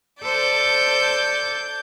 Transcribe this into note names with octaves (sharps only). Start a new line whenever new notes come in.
A4 C5 D5 G6